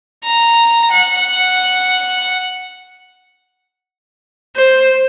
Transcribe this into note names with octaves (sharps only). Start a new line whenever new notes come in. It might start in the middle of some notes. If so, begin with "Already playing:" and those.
A#5
F#5
C5